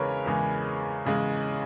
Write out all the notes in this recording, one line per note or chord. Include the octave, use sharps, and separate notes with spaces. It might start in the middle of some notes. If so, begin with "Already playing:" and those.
Already playing: E2 C#3 G#3 G#4 A#4 B4 C#5
E2 C#3 G#3
E2 C#3 G#3